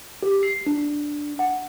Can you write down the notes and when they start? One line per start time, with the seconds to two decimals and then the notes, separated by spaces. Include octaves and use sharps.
0.23 G4
0.43 C7
0.67 D4
1.39 F#5